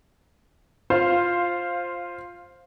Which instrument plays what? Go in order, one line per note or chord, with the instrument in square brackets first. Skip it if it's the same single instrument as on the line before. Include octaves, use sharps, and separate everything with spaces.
[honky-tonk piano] F4 C5 F5